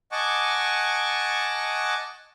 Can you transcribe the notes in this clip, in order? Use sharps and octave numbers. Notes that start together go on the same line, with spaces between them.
D#5 F#5 G#5 A5 C#6 D6